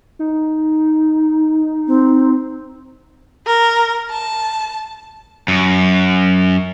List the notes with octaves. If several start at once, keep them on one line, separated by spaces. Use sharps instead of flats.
D#4
C4
A#4
A5
F#2